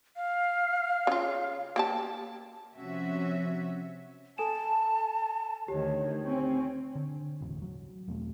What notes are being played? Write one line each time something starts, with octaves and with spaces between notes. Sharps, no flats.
F5
C#3 F4
A#3 G4 A5
C3 F3 C#4 F#4 E5
A4 G#5 A5 E7
D2 D#3 G4 C#5
C4 C#4
D3
E1 A1 D2
F#3
E1 E2 B2 A3